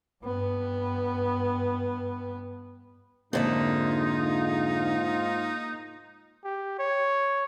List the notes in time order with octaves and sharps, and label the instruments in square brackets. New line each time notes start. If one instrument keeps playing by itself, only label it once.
[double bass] G2 B3
[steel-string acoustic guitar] F2 D3 E5 [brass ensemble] G#2 F4 [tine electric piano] A#3 [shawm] D#4
[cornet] G4
C#5